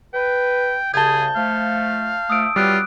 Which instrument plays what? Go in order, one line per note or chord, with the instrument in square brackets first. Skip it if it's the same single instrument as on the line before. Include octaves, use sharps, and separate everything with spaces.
[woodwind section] B4 [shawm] G5
[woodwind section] C2 C#3 [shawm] G#4 [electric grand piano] A5 G#6 [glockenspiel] G6 G7
[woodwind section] F3 A3 [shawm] F5
[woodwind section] F3 A3 [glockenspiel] D#6 E6 D7
[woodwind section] F#3 B3 C4 [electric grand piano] G3 [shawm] F4 [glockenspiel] D6 F#6 D7